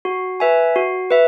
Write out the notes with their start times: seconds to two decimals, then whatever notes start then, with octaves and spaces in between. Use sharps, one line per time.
0.05 F#4
0.40 B4 E5 G#5
0.76 F#4
1.10 B4 E5